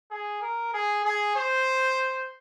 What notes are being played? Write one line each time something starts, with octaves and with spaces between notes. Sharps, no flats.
G#4
A#4
G#4
G#4
C5